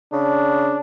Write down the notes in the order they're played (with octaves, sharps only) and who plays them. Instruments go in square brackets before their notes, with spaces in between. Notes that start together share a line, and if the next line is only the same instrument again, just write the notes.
[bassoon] C#3 [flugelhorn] D4